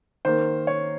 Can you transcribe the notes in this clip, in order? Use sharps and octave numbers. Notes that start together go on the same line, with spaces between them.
D#3 A#3 C5
C#5